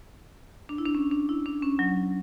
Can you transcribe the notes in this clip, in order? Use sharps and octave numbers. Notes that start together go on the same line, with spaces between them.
D4
E4
D4
C#4
D4
E4
D4
C#4
F#3